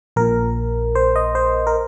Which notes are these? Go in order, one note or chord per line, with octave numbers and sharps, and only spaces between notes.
A#1 A#2 A#4
C5
D#5
C5
A#4